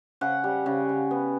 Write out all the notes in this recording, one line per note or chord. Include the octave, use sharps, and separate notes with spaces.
C#3 F#5
G3
C#3
C#3
B3